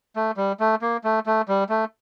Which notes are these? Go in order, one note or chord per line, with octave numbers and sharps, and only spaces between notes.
A3
G3
A3
A#3
A3
A3
G3
A3